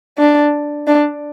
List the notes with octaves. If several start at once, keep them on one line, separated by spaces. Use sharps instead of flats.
D4
D4